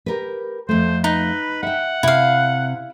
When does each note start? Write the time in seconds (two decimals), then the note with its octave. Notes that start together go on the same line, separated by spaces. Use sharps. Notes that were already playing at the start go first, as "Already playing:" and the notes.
0.06 G4 A#4 B4
0.69 F2 A3 C5
1.04 D#4 B4
1.63 E5 F#5 G5
2.03 C3 E4 F5